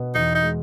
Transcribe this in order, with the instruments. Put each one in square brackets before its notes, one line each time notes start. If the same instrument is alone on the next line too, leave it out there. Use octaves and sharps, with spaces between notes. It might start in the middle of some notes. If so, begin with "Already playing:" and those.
Already playing: [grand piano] B2 B3
[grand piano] E2 [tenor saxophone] D#4
[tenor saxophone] D#4
[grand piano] G#3